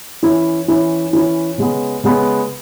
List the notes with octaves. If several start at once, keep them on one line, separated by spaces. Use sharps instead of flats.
E3 C#4 E4
E3 C#4 E4
E3 C#4 E4
C#3 G#3 B3
C#3 G#3 B3